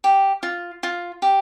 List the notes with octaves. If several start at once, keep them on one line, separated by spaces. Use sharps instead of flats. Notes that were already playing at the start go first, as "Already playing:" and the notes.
G4
F4
F4
G4